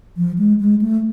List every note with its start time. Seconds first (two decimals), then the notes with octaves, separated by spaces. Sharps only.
0.17 F3
0.38 G#3
0.60 G#3
0.81 A3